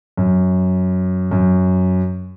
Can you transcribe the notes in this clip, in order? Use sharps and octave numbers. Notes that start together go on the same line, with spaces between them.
F#2
F#2